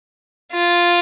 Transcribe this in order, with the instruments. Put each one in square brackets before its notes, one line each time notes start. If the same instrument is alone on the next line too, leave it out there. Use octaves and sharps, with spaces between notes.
[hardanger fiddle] F4